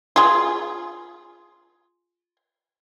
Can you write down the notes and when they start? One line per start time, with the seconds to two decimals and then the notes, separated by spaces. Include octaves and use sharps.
0.16 F4 G#4